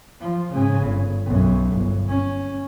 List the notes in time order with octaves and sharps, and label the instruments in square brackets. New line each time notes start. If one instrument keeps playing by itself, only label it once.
[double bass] F3
G#2 C#3
G1
B1 F#2
G1
C#4